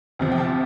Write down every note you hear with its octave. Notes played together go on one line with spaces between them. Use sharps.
D2 C3 F3
G5
A5